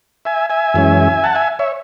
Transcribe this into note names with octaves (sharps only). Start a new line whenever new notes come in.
E5 G#5
E5 G#5
F#2 E3 G#3 C#4
F#5 A5
E5 G#5
C#5 E5